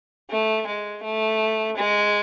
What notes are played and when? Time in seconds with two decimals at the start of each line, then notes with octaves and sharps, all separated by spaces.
0.30 A3
0.67 G#3
1.04 A3
1.77 G#3